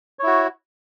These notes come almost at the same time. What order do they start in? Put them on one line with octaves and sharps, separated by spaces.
C#5 E4 F#4